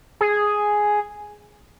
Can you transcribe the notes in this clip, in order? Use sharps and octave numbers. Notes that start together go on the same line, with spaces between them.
G#4